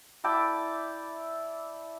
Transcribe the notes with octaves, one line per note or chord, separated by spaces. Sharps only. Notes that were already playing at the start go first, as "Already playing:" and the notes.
E4 D5 G5 A5